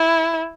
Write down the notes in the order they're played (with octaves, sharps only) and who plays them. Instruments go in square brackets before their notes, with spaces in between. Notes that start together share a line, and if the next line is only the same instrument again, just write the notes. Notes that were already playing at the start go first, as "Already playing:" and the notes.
Already playing: [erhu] E4